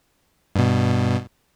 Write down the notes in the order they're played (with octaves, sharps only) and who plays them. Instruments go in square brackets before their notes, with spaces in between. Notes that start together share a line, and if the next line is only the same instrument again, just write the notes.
[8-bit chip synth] G2 B2